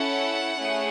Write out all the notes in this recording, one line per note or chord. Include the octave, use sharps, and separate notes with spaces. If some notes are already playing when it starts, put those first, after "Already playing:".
Already playing: C#4 E4 A4 F#5
A3 C#4 E4 G#4